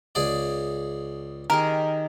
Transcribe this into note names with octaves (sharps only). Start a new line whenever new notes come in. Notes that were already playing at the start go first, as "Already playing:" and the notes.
C#2 G#4 D5
D#3 G4 G#4 A#4